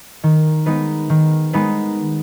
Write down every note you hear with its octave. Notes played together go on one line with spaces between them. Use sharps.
D#3
G#3 B3 D#4 B4
D#3
G#3 B3 D#4 B4